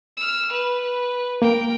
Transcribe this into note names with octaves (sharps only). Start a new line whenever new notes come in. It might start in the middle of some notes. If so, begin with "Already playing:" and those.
E6 F6
B4
A#3 A#4 G5